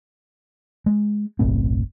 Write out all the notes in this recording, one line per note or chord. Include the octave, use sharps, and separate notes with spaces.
G#3
F#1 B1 A2 C4